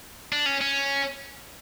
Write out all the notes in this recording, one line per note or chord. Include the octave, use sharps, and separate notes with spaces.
D4
C#4
C#4